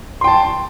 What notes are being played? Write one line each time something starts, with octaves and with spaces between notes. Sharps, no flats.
G5 A5 C6